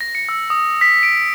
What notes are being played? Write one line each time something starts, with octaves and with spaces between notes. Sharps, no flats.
A#6
C#7
E6
D#6
B6
D7